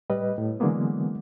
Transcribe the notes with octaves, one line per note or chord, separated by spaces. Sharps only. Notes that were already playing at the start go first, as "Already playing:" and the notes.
A2 G3 B4 D#5
A2
D3 E3 F#3 G#3 A#3 B3